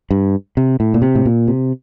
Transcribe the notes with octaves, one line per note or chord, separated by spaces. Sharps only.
G2
C3
A2
A#2
C3
A2
A#2
C3